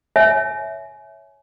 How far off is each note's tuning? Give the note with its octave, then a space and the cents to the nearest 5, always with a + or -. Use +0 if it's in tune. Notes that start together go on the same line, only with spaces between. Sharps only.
C#5 +0 E5 -5 G#5 +25